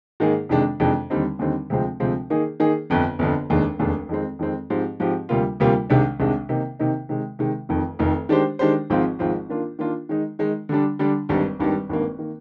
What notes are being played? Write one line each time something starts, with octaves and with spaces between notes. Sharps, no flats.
G#2 D#3 A#3 D#4 G#4
F2 C3 D#3 G#3 D4
F2 C3 D#3 G#3 D4
D#2 D3 G3 C4 D#4
D#2 D3 G3 C4 D#4
D2 C3 F3 G#3 C4
D2 C3 F3 G#3 C4
D#3 A#3 D#4 G#4
D#3 A#3 D#4 G#4
G1 F2 D3
G1 F2 D3
F1 D#2 D#3 G#3 D4
F1 D#2 D#3 G#3 D4
F2 D#3 G#3 C4
F2 D#3 G#3 C4
G#2 F3 C4 G4
G#2 F3 C4 G4
D2 C3 G3 A#3 F4
D2 C3 G3 A#3 F4
C2 C3 D#3 G#3 D4
C2 C3 D#3 G#3 D4
C3 D#3 A#3 D#4
C3 D#3 A#3 D#4
C3 D#3 G#3
C3 D#3 G#3
F1 F2 D#3
F1 F2 D#3
D#3 G#3 D4 G4 C5
D#3 G#3 D4 G4 C5
G#1 G#2 F3 C4 F4
G#1 G#2 F3 C4 F4
D#3 A#3 D4 F4
D#3 A#3 D4 F4
D#3 G#3 D#4
D#3 G#3 D#4
D3 G3 D4
D3 G3 D4
G#1 G2 D#3 G3
G#1 G2 D#3 G3
G#1 G2 D#3 A#3
D#3 A#3